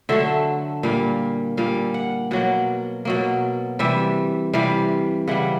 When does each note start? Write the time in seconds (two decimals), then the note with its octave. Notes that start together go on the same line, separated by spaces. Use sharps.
0.09 D3 F#3 A3 E5
0.83 A#2 G3 A#3 F5
1.57 A#2 G3 A#3 F5
1.94 F#5
2.31 B2 F#3 A#3 F#5
3.05 B2 F#3 A#3
3.79 C3 E3 G3 E5
4.53 C3 E3 G3 F5
5.27 C#3 E3 G3 F#5